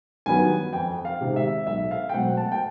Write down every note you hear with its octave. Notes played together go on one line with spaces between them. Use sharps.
G2 D#3 F#3 B3 G#5
F2 G5
F5
C3 D#3 G#3
E5
B1 E5
F5
G5
B2 F#3 A3 C4 F#5
A5
G5